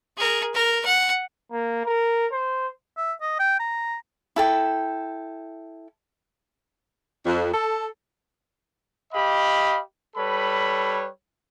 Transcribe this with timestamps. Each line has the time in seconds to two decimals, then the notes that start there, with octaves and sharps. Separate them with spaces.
0.17 G#4 A#4
0.55 A#4
0.86 F#5
1.52 A#3
1.85 A#4
2.32 C5
2.97 E5
3.21 D#5
3.39 G5
3.60 A#5
4.36 E4 A4 G5
7.26 F2
7.54 A4
9.13 G4 D#5 F5 B5
10.17 G3 A4 B4 C#5 B5